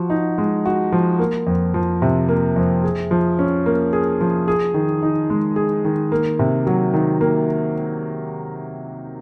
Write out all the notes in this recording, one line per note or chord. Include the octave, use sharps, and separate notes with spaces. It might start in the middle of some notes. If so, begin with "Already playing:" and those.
Already playing: F3 F#4
D#4
G#3
F#4
F3
A#3
F2
F3
C3
A#3
F2
G#4
F3
C#4
A#3
G#4
F3
G#4
D#3
D#4
G#3
G#4
D#3
A#3
C3
F#3
D#3
A#3